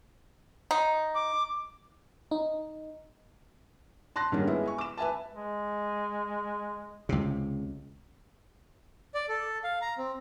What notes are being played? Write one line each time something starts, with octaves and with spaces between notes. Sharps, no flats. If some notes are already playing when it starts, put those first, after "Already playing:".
D#4
D6
D#4
A5 C6 F#6 A#6
G#2 D#3 G3 A#3 C#4 D4
G#3 B3 E4
G#5 C#6
D6 E7
B4 E5 G#5 A5
G#3
C#2 C3
D5
A4
F5
A#5
C4